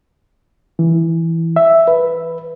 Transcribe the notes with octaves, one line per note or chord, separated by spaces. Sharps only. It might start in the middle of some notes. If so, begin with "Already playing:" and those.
E3
E5
B4